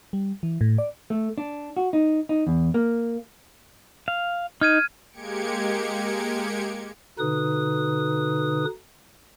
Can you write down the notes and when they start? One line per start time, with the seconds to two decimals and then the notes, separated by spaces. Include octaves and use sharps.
0.13 G3
0.43 E3
0.61 A2
0.78 D5
1.10 A3
1.38 D4
1.77 F#4
1.93 D#4
2.29 D#4
2.47 E2
2.74 A#3
4.08 F5
4.61 D#4 F6 G#6 D#7
5.11 G#3 A#3 G4 G#6 C#7 D7
7.19 B2 D3 D#4 B4 D#6